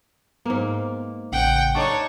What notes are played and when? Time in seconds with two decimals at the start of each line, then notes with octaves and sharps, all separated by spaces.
0.46 G#2 A#3 B3
1.32 A1 C#3 F#5 G5
1.75 D4 D#4 A4 C#5 D5 C#6